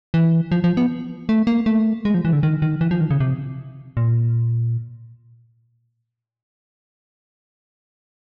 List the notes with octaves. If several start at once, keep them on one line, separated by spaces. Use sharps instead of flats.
E3
F3
F3
B3
A3
A#3
A3
G#3
F3
E3
D3
D#3
D#3
E3
F3
D#3
C#3
C3
A#2